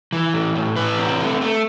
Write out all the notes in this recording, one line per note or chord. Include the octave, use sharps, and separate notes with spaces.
E3
A2
A2
E3 B4
C4
A3
A3